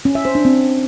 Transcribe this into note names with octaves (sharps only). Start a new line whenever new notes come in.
C#4
E5
C5
D4
C4